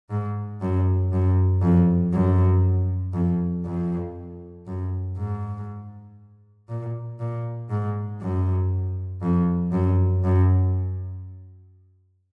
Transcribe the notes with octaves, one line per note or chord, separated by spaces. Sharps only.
G#2
F#2
F#2
F2
F#2
F2
F2
F#2
G#2
A#2
A#2
G#2
F#2
F2
F#2
F#2